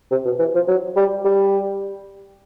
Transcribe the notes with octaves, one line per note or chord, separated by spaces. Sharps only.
C3
B2
E3
F3
F#3
G3
G3